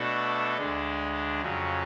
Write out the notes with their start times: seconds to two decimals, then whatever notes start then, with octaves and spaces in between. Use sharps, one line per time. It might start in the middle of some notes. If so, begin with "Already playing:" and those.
Already playing: B2 A3 D4 F#4 A4
0.58 D2 D3 G#3 D4
1.41 F2 C#3 F#3 C#4